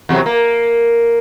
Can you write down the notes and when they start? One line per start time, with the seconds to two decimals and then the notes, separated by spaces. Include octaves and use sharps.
0.09 E2 C3 F#3
0.26 A#3